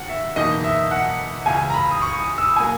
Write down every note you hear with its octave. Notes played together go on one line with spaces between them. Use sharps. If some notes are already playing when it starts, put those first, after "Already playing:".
Already playing: D#2 C#3 F#3 F#5
E5
F#1 E2 B2 A#3 D#4 D#5
E5
F#5
C#2 C#3 E3 G#5
A#5
B5
D#6
C#6
D#6
E6
B2 F#3 A#3 G#5